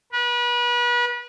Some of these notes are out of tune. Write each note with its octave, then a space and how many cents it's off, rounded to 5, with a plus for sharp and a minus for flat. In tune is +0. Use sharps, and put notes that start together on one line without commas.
B4 -35